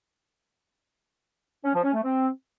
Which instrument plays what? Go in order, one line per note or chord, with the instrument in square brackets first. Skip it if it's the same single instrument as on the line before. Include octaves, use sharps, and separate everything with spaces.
[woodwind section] C#4
F3
C#4
A3
C4